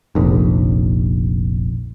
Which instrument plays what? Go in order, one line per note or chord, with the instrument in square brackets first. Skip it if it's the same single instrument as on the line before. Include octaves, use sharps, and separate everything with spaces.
[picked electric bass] F1 A#1